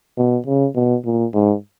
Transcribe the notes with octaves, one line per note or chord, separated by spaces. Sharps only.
B2
C#3
B2
A#2
G#2